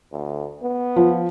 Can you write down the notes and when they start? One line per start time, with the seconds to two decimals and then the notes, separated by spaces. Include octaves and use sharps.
0.12 D2
0.63 B3
0.96 F3